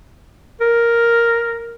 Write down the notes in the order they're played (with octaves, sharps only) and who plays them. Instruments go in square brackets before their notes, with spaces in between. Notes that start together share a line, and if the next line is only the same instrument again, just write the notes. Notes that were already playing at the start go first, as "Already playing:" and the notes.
[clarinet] A#4